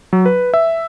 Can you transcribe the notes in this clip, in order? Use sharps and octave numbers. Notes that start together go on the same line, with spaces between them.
F#3
B4
E5